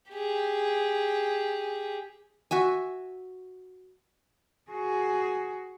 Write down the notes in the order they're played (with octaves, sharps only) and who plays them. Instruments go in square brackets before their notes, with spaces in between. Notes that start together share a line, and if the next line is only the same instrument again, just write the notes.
[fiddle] G4 G#4
[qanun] F#4 E5 G#5
[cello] F#4 G#4